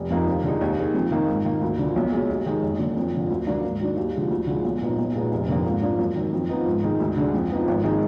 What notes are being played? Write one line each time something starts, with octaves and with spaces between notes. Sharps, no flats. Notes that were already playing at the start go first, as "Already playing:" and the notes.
Already playing: F1
F2 F3 A#3 D#4
D#2
D3 G#3 D#4
D#2
D#3 G#3
F2
D#3 A#3 D#4
G#2
D#3 A#3
D2
D3 F3
B1
B2 G#3
D#2
D#3 G#3 D#4
F#1
F#2 D3
F2
D3 F3
D2
D3 F#3 A#3 D4
G#2
D#3 F#3 D4
D#2
D3 F3 G#3
D2
D3 F3 G#3
B1
A#2 F3 B3 D#4
B1
A#2 G#3 B3 D#4
F1
F2 D3 F3 A#3
G#2
F3 A#3 D4
F#2
D#3 F#3
F2
F3 B3 D#4
G#2
D#3 G#3 D#4
D2
D3 G#3 D4
F2
F3 B3 D#4
G#1
D#3 G#3 D#4